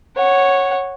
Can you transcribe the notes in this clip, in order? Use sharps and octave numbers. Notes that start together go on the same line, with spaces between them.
C#5 F#5